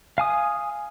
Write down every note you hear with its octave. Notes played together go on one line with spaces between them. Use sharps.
F5 G#5 D#6